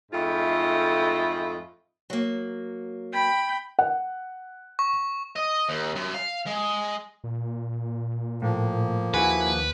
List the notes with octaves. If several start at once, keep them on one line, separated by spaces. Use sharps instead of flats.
F2 G#2 A3 E4 F4 D#5
F#3 A#3
G5 B5
F#5
C#6
D#5
D#2
F#2
F5
G#3
A#2
A2 F3 A#3
D#2 E4 F#4 G#4 B4